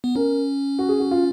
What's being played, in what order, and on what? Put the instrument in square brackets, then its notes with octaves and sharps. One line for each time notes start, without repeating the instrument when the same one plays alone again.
[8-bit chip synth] B3
[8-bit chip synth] C#4 [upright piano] A#4
[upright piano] F#4
G#4
F#4
F4